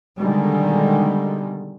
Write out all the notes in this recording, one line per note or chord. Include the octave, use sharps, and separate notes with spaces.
B2 D3 D#3 G3 G#3